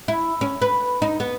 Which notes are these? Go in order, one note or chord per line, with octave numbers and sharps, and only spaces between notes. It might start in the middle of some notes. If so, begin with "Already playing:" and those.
E4
C#4
B4
D#4
B3